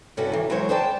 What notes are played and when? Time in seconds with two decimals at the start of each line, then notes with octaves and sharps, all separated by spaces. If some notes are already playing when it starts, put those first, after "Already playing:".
0.17 G2 C3 C#4 E4 F#4 A4
0.32 D#3 E3
0.50 E3 F#3 G#3 A#4 C5 C#5
0.69 G#4 C5 D5 G5 A5